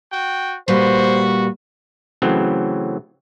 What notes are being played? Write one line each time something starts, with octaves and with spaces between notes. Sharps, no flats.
F#4 G5
A#2 G3 F#4 B4 C5
C#3 E3 F#3 A3 C4